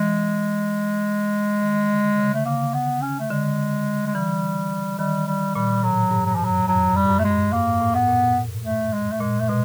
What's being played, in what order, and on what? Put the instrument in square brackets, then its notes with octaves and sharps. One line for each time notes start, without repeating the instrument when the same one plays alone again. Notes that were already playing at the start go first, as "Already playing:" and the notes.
Already playing: [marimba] E3 [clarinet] G#3
[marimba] D#3
D3
C#3
[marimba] D3 [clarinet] A3
[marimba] C#3 [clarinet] A#3
[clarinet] B3
C#4
A3
[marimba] D3 [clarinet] G#3
[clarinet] G#3
[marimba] E3 [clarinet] G3
[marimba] D#3 [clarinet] G3
[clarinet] G3
[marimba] A#2 [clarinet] G3
[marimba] A2 [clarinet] F#3
[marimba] G2
[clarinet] F#3
[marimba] G2
[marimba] F#2 [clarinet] F3
[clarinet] F#3
[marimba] F2 [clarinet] F#3
[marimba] F#2
[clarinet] G3
[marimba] G2
F#2
[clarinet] A3
G#3
[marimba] G2
[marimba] G#2 [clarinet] A#3
[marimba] A2
[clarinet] B3
[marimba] A#2
[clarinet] A3
G#3
A3
[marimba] A#2 [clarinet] G#3
[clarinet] A3
[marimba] B2 [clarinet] G#3